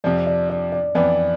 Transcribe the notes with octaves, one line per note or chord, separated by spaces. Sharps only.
F2 C3 F3 D5
D5
D5
D5
F2 E3 B3 D5